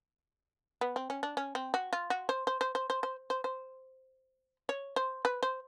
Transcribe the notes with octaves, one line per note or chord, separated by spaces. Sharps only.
B3
C4
C#4
D4
C#4
C4
F#4
F4
F#4
C5
C5
C5
C5
C5
C5
C5
C5
C#5
C5
B4
C5